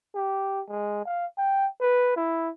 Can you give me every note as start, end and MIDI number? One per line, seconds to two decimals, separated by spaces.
0.15 0.62 67
0.68 1.02 56
1.05 1.26 77
1.37 1.67 79
1.80 2.12 71
2.16 2.50 64